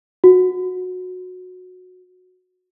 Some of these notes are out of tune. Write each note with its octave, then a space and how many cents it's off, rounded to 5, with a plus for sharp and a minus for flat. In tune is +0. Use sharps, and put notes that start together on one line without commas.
F#4 -15